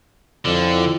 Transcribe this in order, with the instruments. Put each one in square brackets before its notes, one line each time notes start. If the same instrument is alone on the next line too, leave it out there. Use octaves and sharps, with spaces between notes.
[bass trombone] F2 [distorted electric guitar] D3 [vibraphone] E4 F4